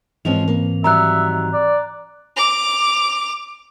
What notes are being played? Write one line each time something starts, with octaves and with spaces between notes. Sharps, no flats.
G#2 E3 F3 G#3 C4 C#4 F7
A#3
D#3 F#3 G3 E5 A#5 F#6
D5
D6 F7